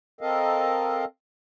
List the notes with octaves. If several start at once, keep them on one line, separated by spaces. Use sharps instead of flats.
C4 A4 A#4 D#5 F5